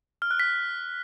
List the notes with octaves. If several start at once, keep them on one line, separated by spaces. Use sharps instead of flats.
F6
F#6
B6